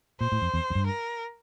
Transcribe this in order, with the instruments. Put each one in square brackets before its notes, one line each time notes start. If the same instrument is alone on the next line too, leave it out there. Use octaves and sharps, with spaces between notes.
[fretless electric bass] A#2 [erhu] C5
[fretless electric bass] A2
F2
E2
F2
G2
[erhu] A#4